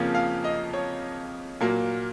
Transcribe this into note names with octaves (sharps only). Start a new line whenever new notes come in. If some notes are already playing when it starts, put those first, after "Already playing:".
Already playing: F2 C#3 F3 A#3 C#4
F5
D#5
C#5
A#2 F#3 A#3